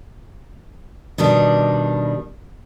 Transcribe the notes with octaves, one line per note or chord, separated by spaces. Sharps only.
B2 D#3 G3 D4